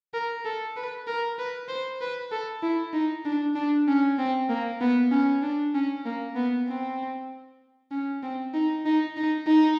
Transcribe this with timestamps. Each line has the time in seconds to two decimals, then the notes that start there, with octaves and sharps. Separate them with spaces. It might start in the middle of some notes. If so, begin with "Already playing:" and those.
0.13 A#4
0.45 A4
0.76 B4
1.07 A#4
1.39 B4
1.69 C5
2.01 B4
2.32 A4
2.63 E4
2.93 D#4
3.25 D4
3.55 D4
3.88 C#4
4.19 C4
4.49 A#3
4.81 B3
5.11 C#4
5.42 D4
5.75 C#4
6.05 A#3
6.36 B3
6.68 C4
7.92 C#4
8.23 C4
8.54 D#4
8.86 D#4
9.17 D#4
9.47 D#4